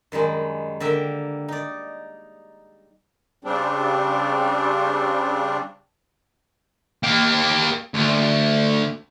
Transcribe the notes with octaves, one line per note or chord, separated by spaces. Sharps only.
F#2 D#3 G3 G#3
D3 A#3 A#4 E5 G5
D#4 D5
C#3 G3 C4 D4
A#3 G4
D2